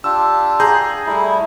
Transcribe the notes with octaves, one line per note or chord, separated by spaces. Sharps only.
D4 F4 G4 E6
G#4 A#5 G6
G3 A3 E4